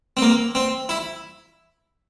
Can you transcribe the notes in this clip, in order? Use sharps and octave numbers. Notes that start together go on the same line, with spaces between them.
C4
A#3
C4
E4